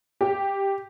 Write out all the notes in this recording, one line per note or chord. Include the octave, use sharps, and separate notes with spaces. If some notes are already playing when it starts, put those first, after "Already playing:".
G4